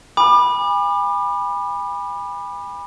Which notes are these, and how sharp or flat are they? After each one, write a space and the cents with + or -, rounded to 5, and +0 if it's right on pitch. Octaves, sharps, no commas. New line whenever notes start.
G#5 -35 B5 -10 D6 +35